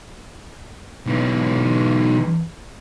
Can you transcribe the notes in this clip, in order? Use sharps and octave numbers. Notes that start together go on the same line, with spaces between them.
B1 E3